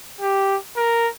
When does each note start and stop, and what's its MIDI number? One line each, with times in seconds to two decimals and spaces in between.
0.21 0.57 67
0.77 1.08 70